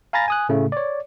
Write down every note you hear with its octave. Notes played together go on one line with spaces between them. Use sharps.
F5 G#5 A#5 B5 A6 A#6
G#5 D#6 F#6
A2 C#3 A3
C#5 D5